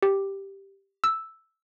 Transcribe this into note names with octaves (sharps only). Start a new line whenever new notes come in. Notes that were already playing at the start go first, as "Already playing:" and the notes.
G4
E6